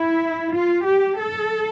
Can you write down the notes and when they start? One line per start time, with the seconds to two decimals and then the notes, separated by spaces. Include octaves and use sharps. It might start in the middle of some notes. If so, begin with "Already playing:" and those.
Already playing: E4
0.53 F4
0.87 G4
1.20 A4